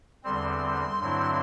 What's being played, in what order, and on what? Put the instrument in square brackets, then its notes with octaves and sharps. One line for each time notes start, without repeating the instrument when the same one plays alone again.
[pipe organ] E2 D3 G3 C4 [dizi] C6
[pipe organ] G2 D3 F#3 C4 E4